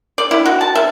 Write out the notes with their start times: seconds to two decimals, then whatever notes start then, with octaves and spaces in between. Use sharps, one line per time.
0.18 D5
0.31 E4
0.46 F#4
0.61 A5
0.75 E5